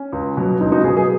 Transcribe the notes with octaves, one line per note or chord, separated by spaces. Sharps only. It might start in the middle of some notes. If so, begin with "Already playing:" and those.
Already playing: C#4
C#2
B2 F#3
C#2 D#4
D#4 F#4
B2 F#3 G#4 B4
G#4 B4